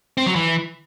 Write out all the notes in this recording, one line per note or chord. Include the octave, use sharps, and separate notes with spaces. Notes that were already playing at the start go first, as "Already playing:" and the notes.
C4
F#3
E3